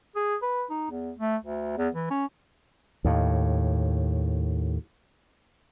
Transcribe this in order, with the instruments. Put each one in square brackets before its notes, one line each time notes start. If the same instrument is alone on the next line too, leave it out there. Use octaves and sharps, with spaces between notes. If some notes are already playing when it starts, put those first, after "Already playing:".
[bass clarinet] G#4
B4
D#4
E2
A3
D2
E2
E3
C#4
[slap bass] D#2 A2